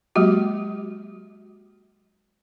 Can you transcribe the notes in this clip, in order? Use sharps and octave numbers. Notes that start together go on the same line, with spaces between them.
F#3 G#3 A#3 F#4 G4